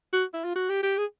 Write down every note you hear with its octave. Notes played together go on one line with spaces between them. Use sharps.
F#4
E4
F4
F#4
G4
G4
G#4